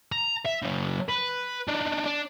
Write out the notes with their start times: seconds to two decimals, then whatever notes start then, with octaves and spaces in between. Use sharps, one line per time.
0.12 A#5
0.46 E5
0.63 C#3 F#3
1.08 B4
1.68 D4 D#4
2.06 D4